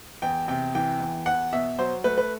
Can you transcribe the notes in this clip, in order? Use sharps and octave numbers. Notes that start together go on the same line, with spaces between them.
E2 G5
C3 G5
E3 G5
E2
E2 F#5
B2 E5
F#3 C5
A3 B4
B4